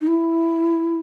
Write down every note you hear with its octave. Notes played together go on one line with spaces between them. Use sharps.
D#4
E4